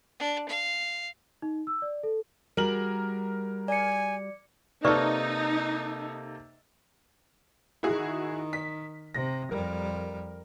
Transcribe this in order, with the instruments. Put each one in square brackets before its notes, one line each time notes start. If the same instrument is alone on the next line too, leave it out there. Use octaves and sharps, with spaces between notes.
[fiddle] D4
F5
[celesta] D#4
E6
D5
A4
[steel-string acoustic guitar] G3 F#4 G#4 [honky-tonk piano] A#4 F#7
[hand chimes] D5 C#7 [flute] G#5
[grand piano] C3 A#3 A4 [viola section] D#4 [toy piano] B4 D5 C#6
[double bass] D#3 [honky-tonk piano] E4 F#4 G#4
[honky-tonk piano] B6
[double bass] C3 [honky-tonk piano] A#6
[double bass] F2 G3 [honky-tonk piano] A#4